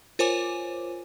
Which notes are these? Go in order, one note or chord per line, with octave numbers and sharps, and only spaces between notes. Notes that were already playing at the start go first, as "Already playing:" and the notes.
F4 A#4 C5 C#5 G#5 D6